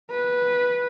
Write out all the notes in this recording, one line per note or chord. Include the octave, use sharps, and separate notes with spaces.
B4